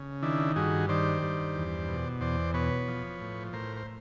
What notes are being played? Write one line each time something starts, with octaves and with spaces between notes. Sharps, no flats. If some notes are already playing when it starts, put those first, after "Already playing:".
Already playing: C#3
D#3 D4 E4
G2 F#4 G#4
D#3 C5 D5
G2
E2
B2
E2 C5 D5
B2 B4 C#5
F3
A2
A2 A#4 C5
C5